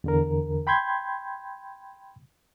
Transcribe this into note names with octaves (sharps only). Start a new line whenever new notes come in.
E2 D3 A#4
G5 B5 C6 G6 G#6